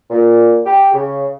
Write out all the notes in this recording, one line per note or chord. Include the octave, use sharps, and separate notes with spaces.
A#2
G4
C#3